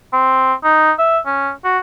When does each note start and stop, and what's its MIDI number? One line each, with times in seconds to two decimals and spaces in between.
0.13 0.53 60
0.64 0.92 63
0.99 1.19 76
1.26 1.51 61
1.65 1.79 66